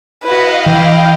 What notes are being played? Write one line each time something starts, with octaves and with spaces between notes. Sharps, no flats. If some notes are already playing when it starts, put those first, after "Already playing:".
E4 F#4 B4 D#5 F5
E3 E4 G5